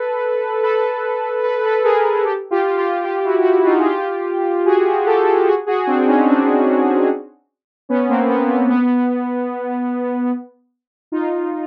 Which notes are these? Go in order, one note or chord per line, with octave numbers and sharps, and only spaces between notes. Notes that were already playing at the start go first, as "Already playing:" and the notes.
Already playing: A4 B4
A4 B4
B4
A4 B4
G#4 A#4
G4 A4
F4 G4
F4 G4
F4 G4
G4
E4 F#4
E4 F#4
E4
D#4 F4
G#4
F4 G4
F#4 G#4
G4 A4
F#4 G#4
F#4 G#4
C4 D4
C#4 D#4
C4 D4
B3 C#4
A#3 C4
B3
A#3
B3
B3
D#4 F4